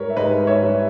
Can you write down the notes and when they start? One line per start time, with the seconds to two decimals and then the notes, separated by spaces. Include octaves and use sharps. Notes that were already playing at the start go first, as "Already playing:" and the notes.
Already playing: G#2 G3 A#4 B4 C#5
0.10 E5
0.17 G#2 B4 D#5
0.47 C#5 E5
0.63 G3